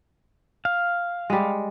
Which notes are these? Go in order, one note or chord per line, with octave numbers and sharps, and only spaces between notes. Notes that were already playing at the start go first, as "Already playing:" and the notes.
F5
G3 G#3